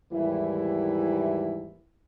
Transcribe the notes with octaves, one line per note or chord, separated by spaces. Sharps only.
D#2 G#2 E3 G3 E4